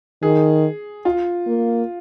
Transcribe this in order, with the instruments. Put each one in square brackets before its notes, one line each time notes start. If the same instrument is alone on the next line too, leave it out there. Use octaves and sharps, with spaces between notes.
[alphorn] D#3 [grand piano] G#4
[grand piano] F4
[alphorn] A#3